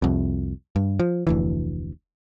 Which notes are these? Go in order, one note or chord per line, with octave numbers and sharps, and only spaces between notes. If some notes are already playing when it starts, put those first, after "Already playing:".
C2 F2
G2
F3
F1 D2 E3